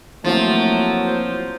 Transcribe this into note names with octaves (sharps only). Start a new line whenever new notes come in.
F3 F#3 A3 A#3 C4 E4
C5